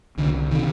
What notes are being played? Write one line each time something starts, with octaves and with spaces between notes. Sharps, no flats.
C2 D3
C3 D#3